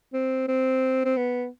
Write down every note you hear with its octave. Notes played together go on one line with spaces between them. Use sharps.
C4
C4
C4
B3